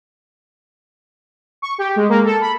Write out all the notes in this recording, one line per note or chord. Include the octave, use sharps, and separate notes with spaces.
C#6
G4
G#3
A#3
A4
B5